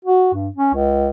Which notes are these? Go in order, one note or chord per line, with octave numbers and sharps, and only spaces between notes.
F#4
G2
C#4
C#2